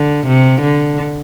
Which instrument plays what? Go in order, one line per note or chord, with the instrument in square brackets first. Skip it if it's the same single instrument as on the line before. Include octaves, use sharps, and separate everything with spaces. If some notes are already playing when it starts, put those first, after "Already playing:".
Already playing: [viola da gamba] D3
C3
D3